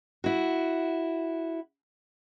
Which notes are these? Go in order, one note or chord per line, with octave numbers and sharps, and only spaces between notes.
E4 F#4